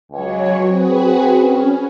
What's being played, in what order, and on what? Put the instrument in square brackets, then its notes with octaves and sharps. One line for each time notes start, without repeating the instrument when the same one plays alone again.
[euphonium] C#2 [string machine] F#3 C#5
[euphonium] C4 [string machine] F#4 G#4 B4
[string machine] C#4